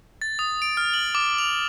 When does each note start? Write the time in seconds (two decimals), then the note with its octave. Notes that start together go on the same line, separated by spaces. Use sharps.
0.22 A6
0.39 D#6
0.62 D7
0.77 F6
0.94 F#7
1.15 D6
1.38 F7